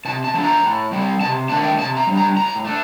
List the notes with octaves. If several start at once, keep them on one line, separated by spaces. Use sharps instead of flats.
C3 A5
A5
F3 A3 D4
A#5
A2
G3 C4
C3 A5
D#3 A3 D4 A5
G5
C3 A5
A#5
G3 D4
A#5
A2 A#5
A3 D4